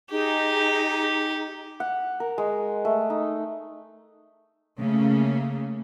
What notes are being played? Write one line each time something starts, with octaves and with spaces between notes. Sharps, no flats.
D#4 G4 G#4
F#5
A#4
G#3
A3
D#4
C#3 A3 A#3